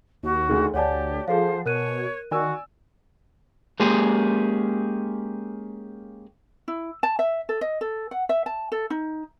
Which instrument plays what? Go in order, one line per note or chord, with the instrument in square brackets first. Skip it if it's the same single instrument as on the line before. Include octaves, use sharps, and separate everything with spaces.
[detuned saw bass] D#2 [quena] F#4
[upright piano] D2 D#3 [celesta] G#4
[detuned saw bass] D2 [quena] G4 [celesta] C#5 D5 [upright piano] F#5 G#5 A5
[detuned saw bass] F3 [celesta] G#4 A4 F5 [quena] C5
[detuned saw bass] B2 [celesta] A#4 F#6 D#7 [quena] C#5
[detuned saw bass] D#3 [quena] F#4 [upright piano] D5 G#5 E6
[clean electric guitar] G#3 A#3 C#4 G4 G#4
[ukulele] E4
A5
E5
A4
D#5
A4
F#5
E5
A5
A4
D#4